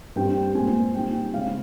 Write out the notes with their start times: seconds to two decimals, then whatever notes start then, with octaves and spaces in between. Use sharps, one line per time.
0.16 G2 G3 C4 G5
0.55 A#2 G#3 C4 G#5
0.95 A#2 G3 C4 D#4 G5
1.33 C#3 G#3 C4 F5